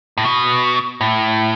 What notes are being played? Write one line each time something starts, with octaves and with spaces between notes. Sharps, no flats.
A2
B2
A2